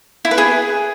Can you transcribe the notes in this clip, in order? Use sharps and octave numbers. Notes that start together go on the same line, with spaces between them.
E4
B4
G#4